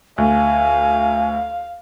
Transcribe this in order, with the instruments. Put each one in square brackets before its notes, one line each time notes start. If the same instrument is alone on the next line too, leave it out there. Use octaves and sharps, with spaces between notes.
[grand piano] D2 [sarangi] F5 [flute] G#5